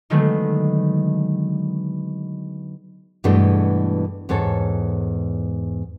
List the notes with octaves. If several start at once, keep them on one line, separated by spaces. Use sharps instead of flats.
D3 D#3 F#3 G#3 A3 B3
G2 B2 E3 G#3 A3 D4
E2 G#2 A4 C#5